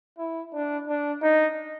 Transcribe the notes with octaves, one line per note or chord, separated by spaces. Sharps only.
E4
D4
D4
D#4